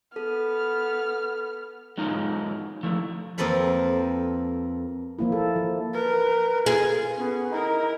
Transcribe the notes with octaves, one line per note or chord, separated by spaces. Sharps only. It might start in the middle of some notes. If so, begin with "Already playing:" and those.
B3 A4 F6
F#3 G#3 D#4 F4
F3 A3 E4
F2 A#3 C4 A4 B4 B5
F3 A#3 E4
A4
F3
A#4 B4
F4 G#4
B3 C#4
D#4 E4 A#4